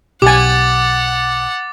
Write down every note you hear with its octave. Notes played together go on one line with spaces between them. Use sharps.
B1 G4 F#5 G#5 D6 A6